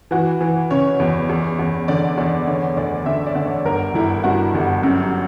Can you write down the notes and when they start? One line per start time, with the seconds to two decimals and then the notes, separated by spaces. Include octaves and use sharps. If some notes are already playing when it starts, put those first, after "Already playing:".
0.11 E3 F#4
0.41 E3
0.71 C#3 C#5
1.00 E2
1.29 E2
1.59 E2
1.88 D3 D5
2.17 E2 D5
2.47 D3 C#5
2.76 D2 D5
3.06 D3 E5
3.26 D5
3.35 D3
3.46 C#5
3.65 G1 A#4
3.94 G1 E4
4.24 G2 F#4
4.54 G1
4.83 F#2